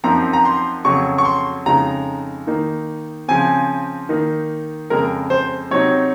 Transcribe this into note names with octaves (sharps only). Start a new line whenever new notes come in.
F#2 F3 C4 D#4 A#5
A#5
C6
F2 C#3 F#3 C#6
C#6
C6
F2 C#3 G#3 D#4 A#5
D#3 A#3 D#4
C#3 F3 C4 G#5
D#3 A#3 D#4
F2 C#3 G#3 A#4
C5
C3 F#3 C4 D#4 C#5